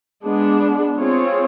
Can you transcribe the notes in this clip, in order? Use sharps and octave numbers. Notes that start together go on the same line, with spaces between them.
G#3 B3 D4
C4 F4 G#4 C#5